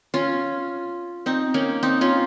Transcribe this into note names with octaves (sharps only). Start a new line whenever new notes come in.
C#4 F4
C4 D#4
A#3 C#4
C4 D#4
C#4 F4